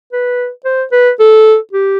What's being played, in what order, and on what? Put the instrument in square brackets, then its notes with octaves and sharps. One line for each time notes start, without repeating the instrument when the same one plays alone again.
[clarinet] B4
C5
B4
A4
G4